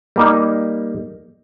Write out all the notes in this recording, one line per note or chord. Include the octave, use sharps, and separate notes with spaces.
G3 A#3 D#4